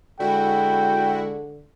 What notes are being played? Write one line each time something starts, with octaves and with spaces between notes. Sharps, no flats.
D3 G#3 E4 F#4 G5